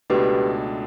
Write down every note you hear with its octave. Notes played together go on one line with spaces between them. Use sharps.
C#2 B2 A3 D4 G4 B4